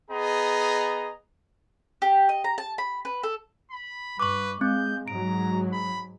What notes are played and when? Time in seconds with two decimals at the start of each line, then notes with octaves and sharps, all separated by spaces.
0.11 B3 G#4 D#5 A#5
2.02 G4
2.29 D#5
2.44 A#5
2.58 A5
2.78 B5
3.05 B4
3.23 A4
3.71 B5
4.20 G2 B4 C#6 D6
4.61 G#3 C4 G6
5.08 G#2 F#3 A#5 D7
5.73 B5